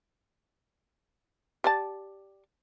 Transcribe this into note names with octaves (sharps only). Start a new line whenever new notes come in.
G4 D5 A5